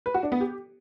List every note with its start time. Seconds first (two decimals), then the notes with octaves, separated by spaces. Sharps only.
0.06 B4
0.14 F#4
0.23 D4
0.32 B3
0.40 G4